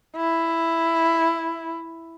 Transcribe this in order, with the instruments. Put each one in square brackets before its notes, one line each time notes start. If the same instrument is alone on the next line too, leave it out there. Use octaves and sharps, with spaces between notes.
[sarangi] E4